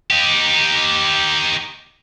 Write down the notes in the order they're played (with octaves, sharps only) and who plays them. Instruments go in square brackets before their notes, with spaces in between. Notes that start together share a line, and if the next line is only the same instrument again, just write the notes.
[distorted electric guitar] D#4 G4